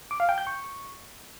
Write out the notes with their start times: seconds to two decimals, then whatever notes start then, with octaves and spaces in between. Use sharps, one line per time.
0.11 D6
0.20 F5
0.29 G5
0.38 G6
0.47 C#6